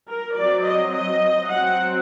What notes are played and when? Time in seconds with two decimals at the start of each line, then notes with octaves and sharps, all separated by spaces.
0.09 A#4
0.37 F#3 C4 D5
0.66 D#5
0.94 D#5
1.49 F#3 C4 F#5